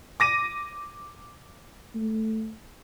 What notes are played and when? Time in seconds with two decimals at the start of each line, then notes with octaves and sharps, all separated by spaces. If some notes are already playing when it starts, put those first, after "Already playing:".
0.20 D6 A#6 D#7
1.95 A3